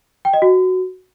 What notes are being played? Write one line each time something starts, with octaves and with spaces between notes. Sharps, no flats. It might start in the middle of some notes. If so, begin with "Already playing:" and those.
G5
D#5
F#4